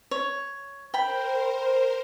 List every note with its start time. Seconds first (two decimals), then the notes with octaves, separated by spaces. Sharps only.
0.11 C#5
0.94 A#4 C5 G5 B5